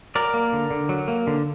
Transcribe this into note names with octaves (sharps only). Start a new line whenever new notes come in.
F#3 A#4 D5
A#3
D3
D3
F#3
A#3
D3